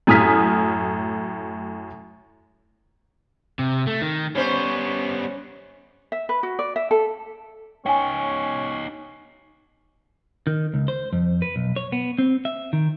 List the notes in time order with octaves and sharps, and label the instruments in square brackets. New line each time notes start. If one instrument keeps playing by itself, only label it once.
[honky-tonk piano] F#2 A2 G#5 D#6 F6 B6
[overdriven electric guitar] C3
A3
D#3
[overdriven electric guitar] G3 B3 [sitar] C#4 C5
[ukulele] E5
B4
F#4
D5
E5
A4
[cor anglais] C#4 [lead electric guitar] D#4 C#5 [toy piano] G5 G#5
[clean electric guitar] D#3
C#2
C5
F2
B4
B1
C#5
B3
C4
E5
D#3